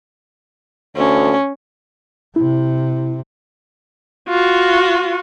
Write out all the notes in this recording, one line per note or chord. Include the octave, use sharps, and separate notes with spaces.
D2 C#4
C3 E4
F4 F#4